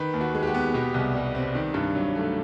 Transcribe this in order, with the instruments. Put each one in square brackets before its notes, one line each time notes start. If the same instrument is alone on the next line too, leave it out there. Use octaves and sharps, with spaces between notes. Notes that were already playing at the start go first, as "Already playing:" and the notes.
Already playing: [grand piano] D#3 B4
D#2
F#4
G#3
G4
F#4
B3
B2 G4
C2
G3
C4
D#3
G2
F#3
A3